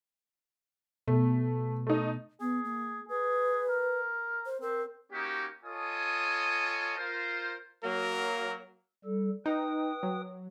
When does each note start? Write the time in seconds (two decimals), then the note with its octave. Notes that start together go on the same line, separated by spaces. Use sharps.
1.08 B2 A3
1.87 A3 D#4
2.41 B3 G#4
2.64 A#3
3.09 G#4 B4
3.68 A#4
4.46 C5
4.62 C4 A#4
5.12 A#3 C#4 D#4 F#4 G4
5.63 F4 A4 C#5 D#5 G#5 D#6
6.97 F4 A#4 C5
7.84 F#3 A#3 A#4
9.05 G3 A4
9.46 D#4 B4 G5 D#6
10.03 F#3